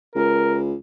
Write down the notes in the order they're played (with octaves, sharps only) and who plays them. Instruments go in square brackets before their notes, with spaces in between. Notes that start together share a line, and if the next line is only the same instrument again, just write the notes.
[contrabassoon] C#2 [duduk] A#4